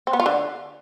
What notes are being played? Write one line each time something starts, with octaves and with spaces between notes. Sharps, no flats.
C4
B3
F4
D3